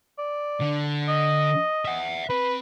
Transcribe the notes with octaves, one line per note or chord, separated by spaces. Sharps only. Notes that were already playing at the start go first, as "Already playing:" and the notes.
D5
D3
D#5
E5 F#5
C4 B4